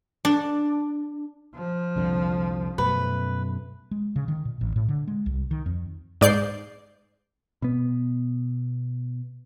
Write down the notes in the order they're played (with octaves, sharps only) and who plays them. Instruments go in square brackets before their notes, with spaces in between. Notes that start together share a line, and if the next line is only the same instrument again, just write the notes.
[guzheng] D4
[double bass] F3
[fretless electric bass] C2 F2 D3
[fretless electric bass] F#2 B2 A3 [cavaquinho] B4
[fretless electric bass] G#3
C#3
D#3
A#2
A1
A2
D3
G#3
C2
D#3
F2
[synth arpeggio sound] G#2 D5 G6 C7
[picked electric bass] B2 B3